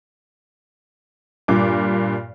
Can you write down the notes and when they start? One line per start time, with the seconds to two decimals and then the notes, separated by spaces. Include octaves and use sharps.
1.48 G2 A#2 D6